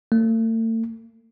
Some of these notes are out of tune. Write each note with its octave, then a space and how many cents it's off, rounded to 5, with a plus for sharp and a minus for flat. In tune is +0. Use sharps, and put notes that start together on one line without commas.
A3 +40